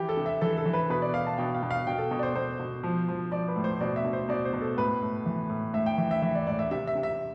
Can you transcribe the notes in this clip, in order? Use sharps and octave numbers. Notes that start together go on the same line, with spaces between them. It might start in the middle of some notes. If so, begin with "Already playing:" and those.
Already playing: E3 G4
A4
C3
E5
E3 A4
A4
E3
B4
B2 B4
D5
B2 F5
A5
B2 G5
F5
B2
F5
B2 G5
A4
B2
D5
C5
B2 C5
B2
F3
F3
F3 D5
B4
A2
C5
B2 D5
E5
B2
C5
B2 D5
C5
B2
A4
A2 B4
A2
E3
A2
A2 E5
G5
E3
E5
E3 E5
D5
A2 D5
E5
C3 E5
E5
C3
E5